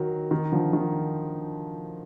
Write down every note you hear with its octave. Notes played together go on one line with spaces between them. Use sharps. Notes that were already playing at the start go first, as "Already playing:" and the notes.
Already playing: D#3 F#3
D#3
D3 F3
D#3